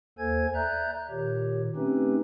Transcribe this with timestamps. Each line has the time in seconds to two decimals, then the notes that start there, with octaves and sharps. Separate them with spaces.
0.18 D#2 A#3 A4 C5 G#5 G#6
0.55 D5 E5 A#5 F#6 G6
1.10 A#2 D#3 G4 C#5
1.76 A3 C4 C#4 D#4 G4 B4